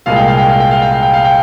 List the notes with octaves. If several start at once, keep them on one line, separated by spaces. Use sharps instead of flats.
C2 A#2 G#3 F5
G5
F5
G5
F5
G5
F5
G5
F5
G5
F5
G5